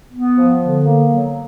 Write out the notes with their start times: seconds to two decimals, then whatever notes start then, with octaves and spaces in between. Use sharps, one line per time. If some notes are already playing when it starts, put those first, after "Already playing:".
0.13 B3
0.37 F3
0.61 D3
0.85 A#3
1.10 F#3